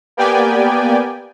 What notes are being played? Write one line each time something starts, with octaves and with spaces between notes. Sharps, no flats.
A#3 B3 G4 D5 G5 G#5